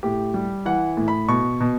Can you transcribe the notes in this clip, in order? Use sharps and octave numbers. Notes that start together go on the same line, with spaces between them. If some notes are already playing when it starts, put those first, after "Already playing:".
A2 G4
G3
E3 F#5
A2
B5
B2 C#6
B2